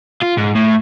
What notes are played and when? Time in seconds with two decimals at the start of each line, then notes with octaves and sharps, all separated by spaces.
0.22 F4
0.37 G#2
0.55 A2